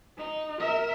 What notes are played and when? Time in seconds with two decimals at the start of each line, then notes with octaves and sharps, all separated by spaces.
0.18 D#4
0.60 A#4 E5